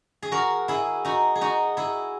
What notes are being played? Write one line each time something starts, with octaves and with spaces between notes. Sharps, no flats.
G#4
F#4 A#4
E4 G#4
D#4 F#4
G#4
D#4 F#4
E4 G#4